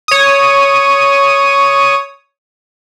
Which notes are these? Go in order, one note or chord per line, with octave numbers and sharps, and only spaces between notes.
C#5 D#6